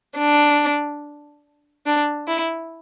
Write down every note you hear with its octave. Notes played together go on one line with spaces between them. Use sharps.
D4
D4
E4